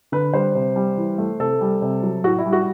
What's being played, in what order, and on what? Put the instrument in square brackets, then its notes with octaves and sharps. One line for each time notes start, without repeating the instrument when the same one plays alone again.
[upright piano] D3 B4
G3 C5
C3
G3
E3
A3
C3 A4
G3
C3
F#3
A2 F#4
E4
G3
F#4